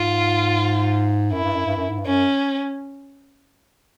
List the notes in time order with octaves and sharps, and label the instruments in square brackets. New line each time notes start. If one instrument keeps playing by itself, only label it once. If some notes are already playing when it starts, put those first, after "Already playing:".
Already playing: [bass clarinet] G#2 [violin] F4
[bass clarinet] F#2 [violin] E4
[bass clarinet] G2
F#2
G2
F#2
G#2
G2
[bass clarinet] F#2 [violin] C#4